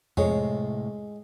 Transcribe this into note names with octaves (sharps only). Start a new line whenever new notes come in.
F2 A2 C3 G#3 C#5